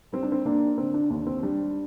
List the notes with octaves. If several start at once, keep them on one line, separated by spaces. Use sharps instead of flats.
G3 C4
D4
C4
A#3 D4
D3 C4
D4
D#2 D4
C4
G3 D4